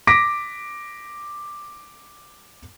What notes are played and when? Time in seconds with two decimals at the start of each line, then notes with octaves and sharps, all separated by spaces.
0.07 D6 A#6 B6 D7